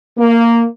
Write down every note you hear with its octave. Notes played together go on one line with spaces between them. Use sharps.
A#3